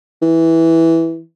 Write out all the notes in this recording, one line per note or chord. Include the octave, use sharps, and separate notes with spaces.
E3